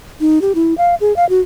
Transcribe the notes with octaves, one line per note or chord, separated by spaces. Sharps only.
D#4
G4
E4
F5
G#4
F5
F#4